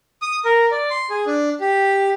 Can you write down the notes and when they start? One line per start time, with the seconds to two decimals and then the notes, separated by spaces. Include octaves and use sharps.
0.22 D#6
0.45 A#4
0.71 D5
0.90 C6
1.10 G#4
1.27 D4
1.60 G4